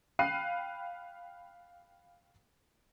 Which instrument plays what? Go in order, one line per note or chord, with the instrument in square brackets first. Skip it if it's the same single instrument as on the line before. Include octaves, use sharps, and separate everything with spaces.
[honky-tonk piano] F5 G5 B5 F#6 C7 D#7